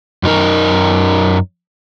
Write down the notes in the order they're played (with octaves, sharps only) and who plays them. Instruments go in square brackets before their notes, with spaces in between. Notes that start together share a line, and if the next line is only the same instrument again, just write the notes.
[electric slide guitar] F#2 D#4 A#4